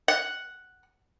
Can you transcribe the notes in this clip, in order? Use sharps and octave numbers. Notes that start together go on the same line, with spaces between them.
F#5